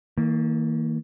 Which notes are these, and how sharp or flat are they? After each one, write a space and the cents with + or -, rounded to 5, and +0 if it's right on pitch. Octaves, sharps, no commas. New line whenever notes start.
D#3 +45 A#3 -20